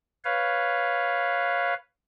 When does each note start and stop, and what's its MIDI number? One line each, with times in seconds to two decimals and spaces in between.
0.25 1.74 71
0.25 1.74 73
0.25 1.74 77